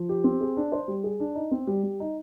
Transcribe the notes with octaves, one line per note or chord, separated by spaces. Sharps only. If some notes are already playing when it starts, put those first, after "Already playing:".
Already playing: F3
G4
C4
G#4
D4
C5
G3
G#4
D4
D#4
C4
G3
G3
D#4